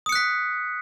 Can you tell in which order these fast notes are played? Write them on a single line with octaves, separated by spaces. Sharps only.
D#6 C#7 F#6 B6